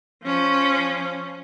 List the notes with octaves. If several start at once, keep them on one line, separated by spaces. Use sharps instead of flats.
F3 C#4